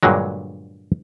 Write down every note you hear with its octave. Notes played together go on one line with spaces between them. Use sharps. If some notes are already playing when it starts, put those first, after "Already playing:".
G2 A#2 D3 F#3 G#3